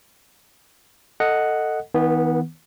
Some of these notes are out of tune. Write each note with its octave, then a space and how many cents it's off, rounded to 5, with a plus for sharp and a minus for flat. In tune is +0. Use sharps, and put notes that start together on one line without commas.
A4 +20 D#5 +0 F#5 +0
D#3 +45 B3 -10